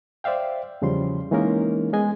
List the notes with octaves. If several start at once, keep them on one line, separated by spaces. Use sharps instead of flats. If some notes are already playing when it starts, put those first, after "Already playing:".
C5 D5 E5 F5 G5
E2 C#3 F3 G3 C6
E3 G#3 A#3 C#4 D#4 A#4
G#3 B3 D#5 G#5